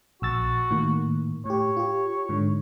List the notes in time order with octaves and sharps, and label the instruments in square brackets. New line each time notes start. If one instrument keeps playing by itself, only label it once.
[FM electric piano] A#1 E6 A6 [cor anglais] F#4
[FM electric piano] A2 D#3 A#3
[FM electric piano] A2 G4 [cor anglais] C#5
[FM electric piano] F4 G4
G#2 D3